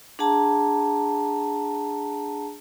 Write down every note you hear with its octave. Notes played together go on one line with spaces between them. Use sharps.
D4 G#4 F#5 A5 A#5